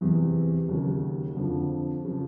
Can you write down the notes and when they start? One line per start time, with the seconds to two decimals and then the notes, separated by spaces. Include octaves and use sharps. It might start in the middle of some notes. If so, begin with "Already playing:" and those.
0.01 E2 C3 E3
0.69 D#2 C#3 F#3
1.35 F2 D3 F3
2.05 C#3 F3